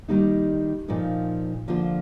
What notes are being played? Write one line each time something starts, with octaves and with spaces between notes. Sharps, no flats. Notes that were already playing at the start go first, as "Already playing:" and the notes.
D#3 G3 A#3 D#4
A#2 F3 A#3 D#4
D3 F3 A#3 F4